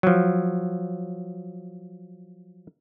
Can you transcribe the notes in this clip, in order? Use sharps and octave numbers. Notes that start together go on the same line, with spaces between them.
F3 F#3